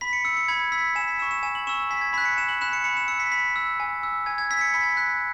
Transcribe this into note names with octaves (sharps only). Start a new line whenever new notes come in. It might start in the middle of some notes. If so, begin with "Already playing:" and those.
B5 B6
C#7
E6 C#7
C#7
B5 G#6
E6 B6
G#5 E7
B6
C#6 E6 E7
E7
G#5 E7
F#7
C#6 E6 E7
G#5 B6
G#6
B5 F#6 B6
C#7
G#5 E7
F#7
B5 F#6 E7
C#7
B5 C#7
E7
E6 C#7
B6
B5 B6
E6
G#5
E6
G#5 G#6
G#6
E6 B6
C#7
B5 B6
G#6
F#6 B6